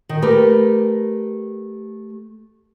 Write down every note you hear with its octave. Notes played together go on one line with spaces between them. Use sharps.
D#3
A3 G4 A#4 B4